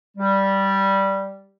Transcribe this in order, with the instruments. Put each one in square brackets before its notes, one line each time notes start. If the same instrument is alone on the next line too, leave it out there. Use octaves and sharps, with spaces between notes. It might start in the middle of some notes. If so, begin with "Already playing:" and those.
[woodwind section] G3